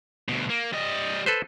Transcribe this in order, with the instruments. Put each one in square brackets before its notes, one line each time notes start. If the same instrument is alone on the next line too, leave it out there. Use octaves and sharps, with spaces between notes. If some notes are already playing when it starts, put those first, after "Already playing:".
[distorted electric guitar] D2 B2
A#3
G3 D#5
[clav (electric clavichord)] A4 B4 C5